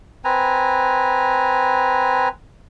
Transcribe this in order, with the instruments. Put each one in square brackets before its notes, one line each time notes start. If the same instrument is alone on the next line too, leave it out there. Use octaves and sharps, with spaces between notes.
[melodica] C4 B4 G#5 A#5